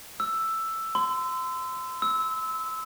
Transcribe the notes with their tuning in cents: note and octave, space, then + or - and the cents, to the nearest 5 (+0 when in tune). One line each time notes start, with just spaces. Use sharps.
E6 +5
C6 -35
E6 -20